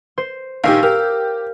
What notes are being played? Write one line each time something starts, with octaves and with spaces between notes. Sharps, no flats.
C5
A#1 D#3 G4 F5 E6
G4 A#4